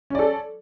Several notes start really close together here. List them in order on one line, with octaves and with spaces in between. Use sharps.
C#4 D5 A4